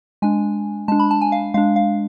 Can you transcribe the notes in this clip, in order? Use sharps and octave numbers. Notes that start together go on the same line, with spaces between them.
G#3 D4 G#5
G#3 D4 A5
B5
A5
G#5
F5
G#3 D4 F5
F5